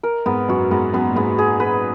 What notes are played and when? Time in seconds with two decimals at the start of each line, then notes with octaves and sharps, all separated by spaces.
0.03 A#4
0.26 G#2 B3
0.49 F#2 F#4
0.71 G#2 B3
0.94 F#2 B3
1.09 A#2
1.16 G#2 B3
1.39 G#4
1.60 B4